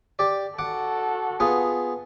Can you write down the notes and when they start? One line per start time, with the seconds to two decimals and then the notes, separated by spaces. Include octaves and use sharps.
0.19 G4 D5
0.59 F#4 A4 F#5 D6
1.40 B3 F4 G#4